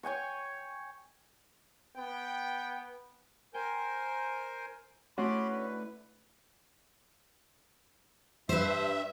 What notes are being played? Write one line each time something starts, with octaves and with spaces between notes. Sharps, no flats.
C#5 G5 G#5 C#6
B3 G5
A#4 C5 G5 G#5
A3 C#4 E4 F#4 B5 C6 D6
D3 B4
G2 B4 C5 E5